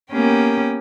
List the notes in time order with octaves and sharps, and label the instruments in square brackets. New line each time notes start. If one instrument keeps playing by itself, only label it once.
[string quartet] A#3 B3 C#4 G4 A#4 G5